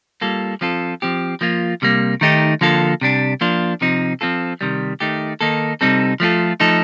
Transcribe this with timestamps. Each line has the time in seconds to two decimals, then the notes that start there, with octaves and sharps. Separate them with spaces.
0.21 G3 A#3 F4 A4
0.61 F3 C4 F4 A4
1.02 F3 C4 G4
1.41 F3 A#3 F4
1.82 C3 G3 A#3
2.21 D#3 A3 D#4 G4
2.61 D3 F3 A#3 F4 A4
3.01 C3 G3 D4
3.41 F3 A#3 D4 F4
3.81 C3 F3 C4 D#4
4.21 F3 C4 F4 A4
4.61 C3 D#3 G3
5.00 D#3 A3 D#4 G4
5.41 D#3 A#3 D#4 A4
5.81 C3 G3 C4 D#4 A4
6.20 F3 A3 C4 F4 A4
6.60 F3 A3 D#4 A4